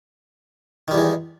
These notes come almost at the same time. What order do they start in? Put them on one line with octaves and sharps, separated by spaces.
D#3 G3 E2 G#3